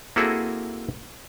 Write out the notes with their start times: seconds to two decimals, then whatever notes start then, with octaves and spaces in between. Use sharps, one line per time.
0.16 A#3 C4 E4 F#4 G#4 A4